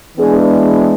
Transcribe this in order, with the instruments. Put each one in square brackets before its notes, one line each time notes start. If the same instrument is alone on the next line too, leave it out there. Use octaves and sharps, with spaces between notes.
[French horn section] E3 G#3 B3 D4 G#4